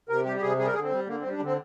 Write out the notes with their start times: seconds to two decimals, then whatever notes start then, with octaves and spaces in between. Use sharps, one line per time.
0.09 C3 A#4
0.25 G3 G4
0.36 G4
0.41 C3 G#4
0.59 G3 G#4
0.66 A#4
0.73 D3 G#4
0.83 C4
0.91 G3
1.07 D3 A#3
1.20 C4
1.25 G3
1.32 D4
1.41 D3 C4